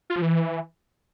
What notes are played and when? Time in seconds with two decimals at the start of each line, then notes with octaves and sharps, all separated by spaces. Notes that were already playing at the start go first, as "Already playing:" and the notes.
0.10 F4
0.16 F3
0.22 E3